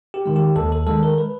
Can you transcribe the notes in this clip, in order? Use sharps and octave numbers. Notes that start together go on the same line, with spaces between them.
G4
D#3 G#3
G4
D#2 A4
A4
D#3 G#3 A4
A#4
B4